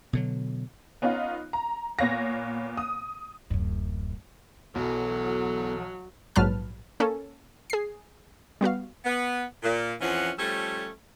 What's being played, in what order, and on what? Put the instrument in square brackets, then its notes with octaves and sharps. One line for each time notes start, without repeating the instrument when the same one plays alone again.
[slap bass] B2 D3 F#3
[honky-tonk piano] B3 C#4 D#4 F4
A#5
A#2 B3 C#5 F5 A#6
D#6
[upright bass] D1 F#2
[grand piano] B1 [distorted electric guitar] E2 [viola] F#3 [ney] A4
[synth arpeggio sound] A#1 G#2 F#3 B4 A5 F6
A#3 C#4 A4
G#4 C7
G3 B3 F#4 F5
[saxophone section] B3
A#2
F2 E3 F3 C#4 F#5
F3 G3 A3 C#4 A4 C#5